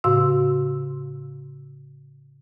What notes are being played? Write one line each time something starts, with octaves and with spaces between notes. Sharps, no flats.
A2 C#3 F#4 F5 C6 E6